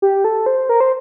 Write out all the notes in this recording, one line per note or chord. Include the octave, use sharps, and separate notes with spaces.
G4
A4
C5
A#4
C5